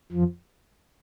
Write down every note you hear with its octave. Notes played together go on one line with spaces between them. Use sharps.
F2 F3